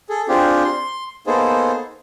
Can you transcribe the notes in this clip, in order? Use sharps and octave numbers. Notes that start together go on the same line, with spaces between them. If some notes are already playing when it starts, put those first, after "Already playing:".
G#4 A4
C4 D4 F4 G4 G#4
C6
A#3 B3 D#4 G#4 A4 C5